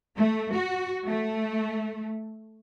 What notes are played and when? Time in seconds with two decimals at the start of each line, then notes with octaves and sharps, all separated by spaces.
0.18 A3
0.55 F#4
1.07 A3